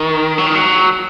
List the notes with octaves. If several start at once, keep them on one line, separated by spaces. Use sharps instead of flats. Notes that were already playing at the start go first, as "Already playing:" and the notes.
Already playing: D#3
F#3
D#3
F#3